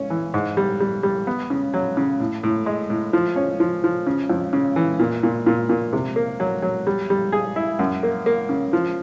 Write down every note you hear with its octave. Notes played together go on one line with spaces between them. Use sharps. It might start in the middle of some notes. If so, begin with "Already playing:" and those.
Already playing: C#4
E3
G#2
G3
G3
G3
B3
C#3
F#3
C#3
A2
A2
G#3
A2
F3
C#4
F3
F3
C#3
F2
C#3
E3
A#2
A#2
A#2
A#2
C3
A#3
F#3
F#3
G3
G3
G#4
E4
F#2
A#3
A#3
C#3
F3